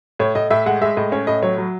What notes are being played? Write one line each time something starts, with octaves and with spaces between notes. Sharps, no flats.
A2 C#5
A2 D#5
A2 E5
G#3 F#5
G#3 E5
A2 D#5
C#4 C#5
A2 D#5
F#3 C#5
F#3